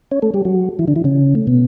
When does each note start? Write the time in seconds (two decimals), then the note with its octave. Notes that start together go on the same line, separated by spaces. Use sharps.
0.11 C#4 C#5
0.22 A3 A4
0.34 G3 G4
0.45 F#3 F#4
0.79 E3 E4
0.88 D3 D4
0.96 E3 E4
1.04 C#3 C#4
1.35 A3
1.47 B2 B3